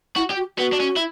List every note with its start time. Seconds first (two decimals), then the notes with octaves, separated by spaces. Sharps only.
0.16 E4 F#4
0.30 G4
0.37 F#4
0.58 B3 F#4
0.72 D4
0.80 C#4
0.96 E4